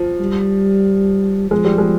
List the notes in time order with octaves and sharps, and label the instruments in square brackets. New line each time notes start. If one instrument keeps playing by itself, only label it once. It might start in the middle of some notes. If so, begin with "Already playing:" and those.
Already playing: [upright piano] F3
[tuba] G3
[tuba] F3 [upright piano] G#3
[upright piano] G3
G#3